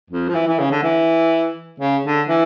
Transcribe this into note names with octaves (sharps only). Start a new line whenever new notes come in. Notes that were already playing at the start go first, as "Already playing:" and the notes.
F2
F3
E3
E3
C#3
D3
E3
C#3
D3
E3